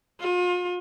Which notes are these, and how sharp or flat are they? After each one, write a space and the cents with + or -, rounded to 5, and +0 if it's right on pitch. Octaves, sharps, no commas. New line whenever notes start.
F4 +40